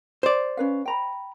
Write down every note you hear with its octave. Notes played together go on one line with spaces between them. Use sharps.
C5 D5
C#4 B4 F5
G5 A#5 B5